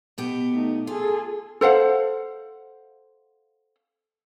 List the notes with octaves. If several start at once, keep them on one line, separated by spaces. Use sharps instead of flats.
B2 B3 G4
A3 D#4
F4 G#4 A4
A4 C5 F5 F#5